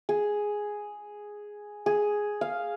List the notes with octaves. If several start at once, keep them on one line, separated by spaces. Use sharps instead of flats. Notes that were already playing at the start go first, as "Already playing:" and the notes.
G#4
G#4
F5